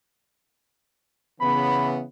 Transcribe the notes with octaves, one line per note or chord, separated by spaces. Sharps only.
C#3 E3 B3 B5